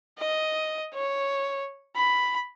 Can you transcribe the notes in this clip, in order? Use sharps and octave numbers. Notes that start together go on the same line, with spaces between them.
D#5
C#5
B5